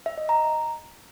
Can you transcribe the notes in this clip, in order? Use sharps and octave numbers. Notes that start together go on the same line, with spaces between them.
E5
D#5
A#5